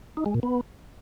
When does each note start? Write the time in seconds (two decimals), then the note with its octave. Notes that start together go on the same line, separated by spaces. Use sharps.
0.17 D#4
0.26 G#3
0.34 A#2
0.43 B3